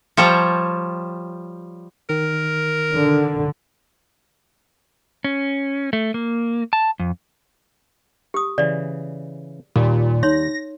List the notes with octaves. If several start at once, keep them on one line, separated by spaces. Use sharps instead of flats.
F3 G3 C#5 A5 A#5
D#3 A#4
D3
C#4
A3
A#3
A5
F2
G4 D#6
C#3 E3 D5
D#2 A#2 G3 A#3
D#4 C#5 C6 A#6